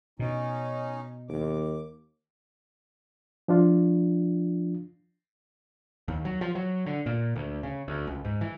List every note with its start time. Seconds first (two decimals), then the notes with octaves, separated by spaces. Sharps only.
0.19 B2 C#4 D#4
1.29 D#2 D6
3.48 F3 D4 F4
6.08 D#2
6.25 F#3
6.41 F3
6.55 F#3
6.86 D3
7.06 A#2
7.36 D2
7.63 C#3
7.88 D2
8.07 C#2
8.25 G#2
8.41 E3